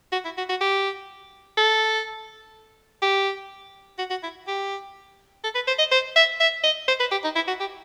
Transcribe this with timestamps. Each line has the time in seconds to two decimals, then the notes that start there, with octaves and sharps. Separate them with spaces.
0.13 F#4
0.25 E4
0.38 F#4
0.50 F#4
0.61 G4
1.57 A4
3.02 G4
3.99 F#4
4.10 F#4
4.23 E4
4.47 G4
5.44 A4
5.55 B4
5.68 C5
5.79 D#5
5.91 C5
6.16 E5
6.40 E5
6.64 D#5
6.88 C5
7.00 B4
7.12 G4
7.24 D#4
7.36 E4
7.48 F#4
7.60 G4